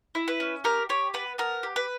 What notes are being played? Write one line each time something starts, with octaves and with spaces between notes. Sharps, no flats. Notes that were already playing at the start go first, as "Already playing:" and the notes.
E4
B4
C#4
G4 A#4
G4 C#5
B3 B4
B3 A#4
G4
B4